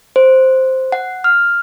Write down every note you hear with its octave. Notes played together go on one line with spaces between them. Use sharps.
C5
F#5
F6